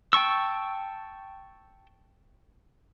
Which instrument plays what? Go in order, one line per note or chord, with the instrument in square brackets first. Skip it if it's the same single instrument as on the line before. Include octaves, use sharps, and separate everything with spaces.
[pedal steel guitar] G5 A5 C#6 E6